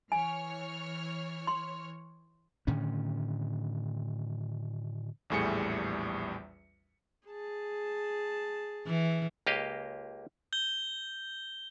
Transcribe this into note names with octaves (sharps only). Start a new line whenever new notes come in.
E3 C#5 G#5 F6
C6
A2 D3 D#3 C#4
A#1 E2 A2 G3 G#4 C#7
G#4 A5
E3
C#2 A#3 G4 D#5 F5
G6 G7